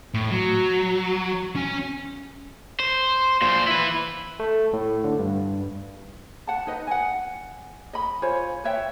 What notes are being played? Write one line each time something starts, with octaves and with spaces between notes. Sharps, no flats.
A2
F#3
C#4 G#5
C5
A#2 C5
E4 B4
A3
A2
D3
G2
F#5 A5
D#4 B4 D#5
F#5 G#5
D#5 B5
F4 C5 C#5 G#5
B4 C#5 E5 G5